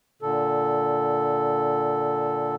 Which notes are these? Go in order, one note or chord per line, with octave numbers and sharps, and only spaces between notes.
A#2 D3 A4